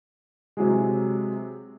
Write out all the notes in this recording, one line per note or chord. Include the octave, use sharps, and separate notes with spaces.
C3 F#3 G#3